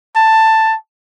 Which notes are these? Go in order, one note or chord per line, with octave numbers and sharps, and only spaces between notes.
A5